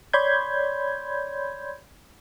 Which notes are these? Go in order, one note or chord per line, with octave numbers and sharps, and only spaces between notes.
C#5 D5 B5 C6 G6 G#6